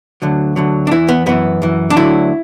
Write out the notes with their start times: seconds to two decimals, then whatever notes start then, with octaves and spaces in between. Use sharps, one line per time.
0.22 D2 D3 F#3
0.56 D2 D3 F#3
0.87 D4
0.91 E2 E3 E4
1.08 B3
1.26 F#2 E3 B3
1.62 F#2 E3
1.90 D4
1.96 D2 D3 F#3 E4